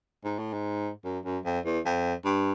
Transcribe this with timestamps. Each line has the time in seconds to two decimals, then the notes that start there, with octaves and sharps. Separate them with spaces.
0.25 G#2
0.39 A2
0.53 G#2
1.05 F#2
1.25 F#2
1.45 F2
1.65 E2
1.86 F2
2.25 G2